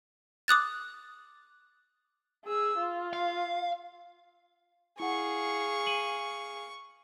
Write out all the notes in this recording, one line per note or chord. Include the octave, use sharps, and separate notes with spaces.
D6 D#6 F#6 A6
G#4 E6
F4
F5
E4 G#4 F5 F#5 C#6
D#7 F#7